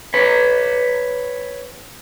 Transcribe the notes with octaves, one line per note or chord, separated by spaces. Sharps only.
B4 C#5